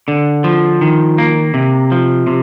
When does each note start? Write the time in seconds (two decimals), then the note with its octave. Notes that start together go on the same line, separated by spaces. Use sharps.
0.08 D3
0.44 F3
0.81 D#3
1.18 A#3
1.54 C3
1.91 F3
2.27 C3